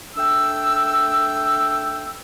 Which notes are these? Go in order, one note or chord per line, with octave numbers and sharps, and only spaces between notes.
A3 D4 G5 E6